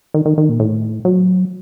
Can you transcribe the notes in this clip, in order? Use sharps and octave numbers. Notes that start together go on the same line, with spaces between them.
D#3
D#3
D#3
A#2
A2
F#3